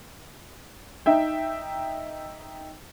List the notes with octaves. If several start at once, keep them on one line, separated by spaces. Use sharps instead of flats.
D#4 E5 G5